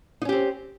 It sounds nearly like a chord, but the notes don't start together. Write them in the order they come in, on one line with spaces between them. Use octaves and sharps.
D#4 C#4 G4 C4